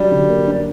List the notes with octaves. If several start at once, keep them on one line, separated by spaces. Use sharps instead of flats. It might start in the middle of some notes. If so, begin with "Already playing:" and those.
Already playing: F#3 G3 D4
D3
A#3
D4